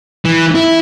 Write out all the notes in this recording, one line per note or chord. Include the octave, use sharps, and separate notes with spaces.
E3
E4